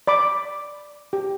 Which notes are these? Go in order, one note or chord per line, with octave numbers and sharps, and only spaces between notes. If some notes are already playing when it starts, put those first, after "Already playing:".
D5 B5 D6
G4